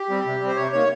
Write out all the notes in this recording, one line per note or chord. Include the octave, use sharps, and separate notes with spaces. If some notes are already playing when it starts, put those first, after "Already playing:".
Already playing: G4
G3 C4
C3
G3 C4
C5
C3 C#5
D#3 A#3 C#5